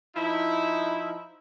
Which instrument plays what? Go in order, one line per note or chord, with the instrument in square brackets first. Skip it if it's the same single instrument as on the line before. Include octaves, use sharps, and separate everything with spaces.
[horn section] F3 D#4 E4